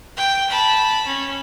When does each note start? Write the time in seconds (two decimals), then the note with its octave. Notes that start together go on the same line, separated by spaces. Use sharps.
0.17 G5
0.49 A5 B5
1.06 C#4